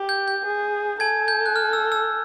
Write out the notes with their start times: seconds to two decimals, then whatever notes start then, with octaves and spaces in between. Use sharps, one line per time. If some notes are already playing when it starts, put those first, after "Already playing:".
Already playing: G4
0.09 G6
0.28 G6
0.46 G#4
1.00 A4 G#5 G#6
1.28 G6
1.46 F#6
1.56 F6
1.73 E6
1.92 E6